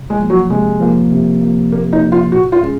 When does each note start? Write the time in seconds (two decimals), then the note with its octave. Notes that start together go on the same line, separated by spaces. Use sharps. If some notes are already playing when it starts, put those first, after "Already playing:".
Already playing: C3
0.10 G#3
0.20 F3 A#3
0.30 F#3
0.50 C3 G#3
0.80 F3 A#3
1.11 C3
1.41 F3 A#3
1.72 C3 A#3
1.93 D#4
2.02 F3 A#3
2.12 F4
2.32 A#2 F#4
2.52 F4
2.63 G#3 C#4 G#4